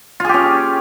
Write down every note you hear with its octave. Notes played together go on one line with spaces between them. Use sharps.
C#4 F4 G4 G#4